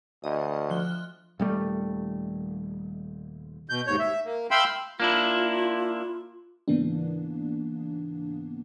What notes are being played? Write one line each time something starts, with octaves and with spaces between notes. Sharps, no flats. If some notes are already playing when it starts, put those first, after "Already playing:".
D2 D#5
F3 F#6 G7
D#1 G3 A3
B2 G6
D#2 G#2 C#5 G6
E5
A#3
E5 F5 G5 B5 C6 E6
A#3 D4 E4 F4
G#2 C#3 E3 A#3 B3 D4